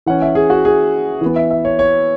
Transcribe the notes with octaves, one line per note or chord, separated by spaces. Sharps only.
E3 C#4 F#5
E5
G#4
F#4
G#4
E3 B3
E5
E5
C#5
C#5